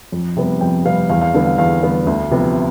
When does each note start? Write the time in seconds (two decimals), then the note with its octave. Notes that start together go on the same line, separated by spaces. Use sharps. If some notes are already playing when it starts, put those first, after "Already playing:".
0.12 F2
0.37 C3 G3 B3
0.61 F2 G5
0.85 C3 G3 B3 F5
1.10 E2 F5
1.22 F5
1.34 D3 G3 B3
1.46 F5
1.58 E2 F5
1.83 D3 G3 B3
2.07 D2
2.31 C3 F3 B3